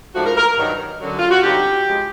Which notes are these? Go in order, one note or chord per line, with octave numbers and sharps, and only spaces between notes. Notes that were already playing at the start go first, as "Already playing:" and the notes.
G#2 F3 A3 D4 F#4
A#4
A#4
G2 D#3 F#3
F#2 D3 F#3
F4
F#4
D3 G3 C4 D#4 G4
C#3 F3 G#3